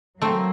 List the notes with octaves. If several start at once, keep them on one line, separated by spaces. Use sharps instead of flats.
F#3 A3 A#3 C4